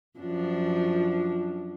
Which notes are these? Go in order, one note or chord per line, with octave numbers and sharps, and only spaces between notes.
F#2 F3 D4